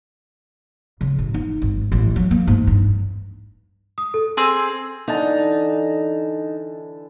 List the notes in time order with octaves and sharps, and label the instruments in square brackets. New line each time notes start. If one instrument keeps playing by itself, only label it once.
[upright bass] C#3
A1
D#4
G#1
A1
F#3
A#3
G#2
G2
[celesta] D#6
A4
[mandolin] C4 G#4 E6
[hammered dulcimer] D3 E3 A5 [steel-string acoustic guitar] D#4